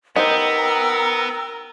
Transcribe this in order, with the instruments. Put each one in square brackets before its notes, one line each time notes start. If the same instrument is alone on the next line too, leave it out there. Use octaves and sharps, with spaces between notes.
[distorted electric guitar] B3 [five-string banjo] D#4 G4 C5 [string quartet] A#4 [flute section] G5 A#5 E6